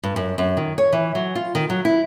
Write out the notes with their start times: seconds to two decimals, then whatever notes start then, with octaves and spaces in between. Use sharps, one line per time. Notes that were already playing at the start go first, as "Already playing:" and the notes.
0.03 G2
0.16 F#2
0.38 F#2
0.57 D#3
0.78 C#5
0.92 E3
1.15 F#3
1.35 F4
1.55 D#3
1.70 F#3
1.85 E4